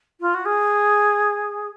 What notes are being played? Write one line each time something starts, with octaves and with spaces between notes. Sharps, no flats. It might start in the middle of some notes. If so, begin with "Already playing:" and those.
F4
F#4
G#4